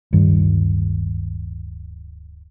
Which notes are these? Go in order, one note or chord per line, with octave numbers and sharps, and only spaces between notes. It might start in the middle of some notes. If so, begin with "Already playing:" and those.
D1 G2 D#3 G3